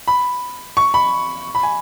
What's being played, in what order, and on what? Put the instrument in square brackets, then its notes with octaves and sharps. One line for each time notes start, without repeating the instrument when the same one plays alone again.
[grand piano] B5
C#6
B5
B5
G#5